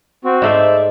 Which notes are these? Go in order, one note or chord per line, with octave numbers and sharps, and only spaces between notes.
C4 F#4
G#2 A3 C5 D5 E5